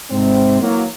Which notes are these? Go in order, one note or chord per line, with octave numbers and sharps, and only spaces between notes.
G#2 C3 C4
E3 F#3 A#3